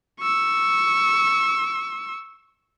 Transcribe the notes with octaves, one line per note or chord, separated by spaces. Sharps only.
C#6 E6